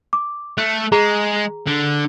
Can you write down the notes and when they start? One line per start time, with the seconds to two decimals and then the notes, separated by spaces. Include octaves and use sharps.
0.13 D6
0.58 A3 F#6
0.92 G#3 G#4 A#5
1.67 D3